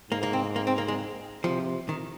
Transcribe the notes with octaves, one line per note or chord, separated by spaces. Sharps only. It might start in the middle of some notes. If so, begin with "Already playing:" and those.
G#2 A#3
A#3
C4
A#3
C4
A#3
G#3
C3 F3
D#3